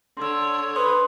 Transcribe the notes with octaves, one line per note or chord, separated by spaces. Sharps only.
D3 C#5 C6 E6
B4 C5 C6 D#6